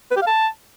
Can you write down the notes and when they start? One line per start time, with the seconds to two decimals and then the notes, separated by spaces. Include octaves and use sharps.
0.11 B4
0.17 G4
0.22 F5
0.27 A5